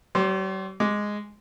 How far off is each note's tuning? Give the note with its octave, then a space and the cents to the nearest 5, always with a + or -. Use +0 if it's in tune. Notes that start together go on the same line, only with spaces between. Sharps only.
G3 -45 C5 +15 D6 +0
G#3 +0 D6 +0